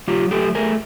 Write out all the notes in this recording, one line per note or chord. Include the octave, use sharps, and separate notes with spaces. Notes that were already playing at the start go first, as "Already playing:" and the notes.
F#3 F4 G4
A3 G4 A4
A3 G#4 A#4